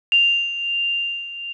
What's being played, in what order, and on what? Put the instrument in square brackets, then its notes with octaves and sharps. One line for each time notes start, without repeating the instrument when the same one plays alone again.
[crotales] F7